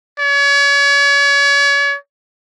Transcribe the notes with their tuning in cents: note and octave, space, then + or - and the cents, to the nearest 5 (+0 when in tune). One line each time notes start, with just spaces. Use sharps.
C#5 +35